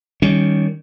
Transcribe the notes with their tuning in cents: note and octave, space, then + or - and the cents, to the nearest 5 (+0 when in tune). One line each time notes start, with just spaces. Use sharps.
D#3 +0 G3 +0 C#4 +15